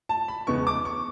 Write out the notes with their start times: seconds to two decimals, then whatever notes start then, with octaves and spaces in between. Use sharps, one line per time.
0.09 A5
0.28 B5
0.47 E2 C#3 G#3 B3 C#6
0.67 D6
0.85 C#6